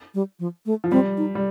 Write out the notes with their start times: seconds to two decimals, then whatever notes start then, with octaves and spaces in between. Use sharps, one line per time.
0.15 G3
0.39 F3
0.66 A3
0.84 F3
0.92 G3 C4
1.17 D#4
1.35 G3